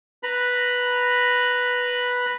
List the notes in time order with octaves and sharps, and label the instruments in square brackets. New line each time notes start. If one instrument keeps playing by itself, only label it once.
[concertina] B4 A#5 B5